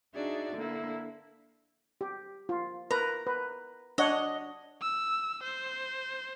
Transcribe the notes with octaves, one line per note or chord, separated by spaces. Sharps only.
D4 D#4 F#4 G#4 D5 E5
D3 A#3 D4 E4
G4
F4
A#4 B4 A#5
B4
D4 C#5 D#5 F#5
E6
C5